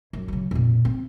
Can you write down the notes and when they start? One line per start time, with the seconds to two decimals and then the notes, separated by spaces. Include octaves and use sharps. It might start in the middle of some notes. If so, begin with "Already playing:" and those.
0.13 F#2
0.28 C#3 F#3
0.51 F2 A#2
0.85 C4